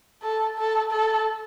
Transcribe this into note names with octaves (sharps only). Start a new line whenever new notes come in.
A4
A4
A4